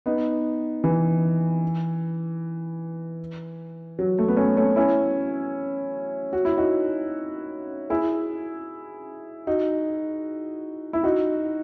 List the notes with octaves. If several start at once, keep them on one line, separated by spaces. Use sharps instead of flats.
B3 D#4
E3
F#3
A3
B3
A3 C#4
A3 C#4
C#4 E4
F#4
E4
D#4 F#4
E4 G#4
D#4 F#4
E4
D#4 F#4